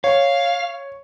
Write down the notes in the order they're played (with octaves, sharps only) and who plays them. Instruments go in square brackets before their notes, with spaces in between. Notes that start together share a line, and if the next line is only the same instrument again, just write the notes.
[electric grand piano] C#5 [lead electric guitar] F5